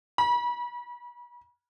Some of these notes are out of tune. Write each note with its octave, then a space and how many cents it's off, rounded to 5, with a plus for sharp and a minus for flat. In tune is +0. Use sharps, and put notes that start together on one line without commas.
B5 -40